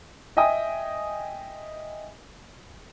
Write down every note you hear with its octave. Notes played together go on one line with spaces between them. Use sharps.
D#5 E5 G5 G#5 D#6